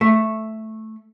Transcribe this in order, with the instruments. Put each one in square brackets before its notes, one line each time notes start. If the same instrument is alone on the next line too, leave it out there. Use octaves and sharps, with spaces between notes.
[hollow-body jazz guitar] A3